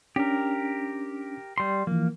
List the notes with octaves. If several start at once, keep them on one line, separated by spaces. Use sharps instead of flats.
C#4 D4 G4 A#4
G3 C6
E3 F3 A#3